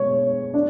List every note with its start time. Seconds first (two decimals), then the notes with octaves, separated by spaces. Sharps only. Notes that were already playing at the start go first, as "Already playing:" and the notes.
Already playing: B2 G#3 C#5
0.54 D4